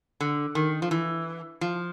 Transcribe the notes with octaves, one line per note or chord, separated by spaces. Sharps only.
D3
D#3
F3
E3
F3